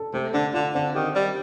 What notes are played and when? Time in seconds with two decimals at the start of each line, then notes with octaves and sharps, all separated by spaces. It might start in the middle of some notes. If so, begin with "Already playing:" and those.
Already playing: A4
0.14 C3 A3
0.34 D3 D4
0.54 D3 F4
0.75 D3 C4
0.95 D#3 G4
1.16 G3 D5